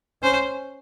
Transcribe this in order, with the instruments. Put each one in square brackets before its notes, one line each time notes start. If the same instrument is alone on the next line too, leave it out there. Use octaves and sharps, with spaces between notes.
[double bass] C#4 [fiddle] C5